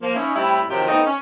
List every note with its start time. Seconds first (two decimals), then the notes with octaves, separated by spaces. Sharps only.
0.02 F3 A#3
0.15 C#4 D#4 E4
0.35 A2 G3 C4 E4
0.69 C3 D#3 F3 F#3 D#4 G4
0.88 A3 B3 C4 D#4
1.05 C#4